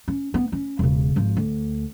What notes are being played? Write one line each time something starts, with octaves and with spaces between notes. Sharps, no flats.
C#4
B3
C#4
E1 C#3
G#1 F3
D2